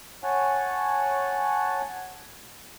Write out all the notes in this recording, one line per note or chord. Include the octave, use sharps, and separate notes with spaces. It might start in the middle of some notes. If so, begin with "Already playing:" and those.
C#5 F#5 G#5 A5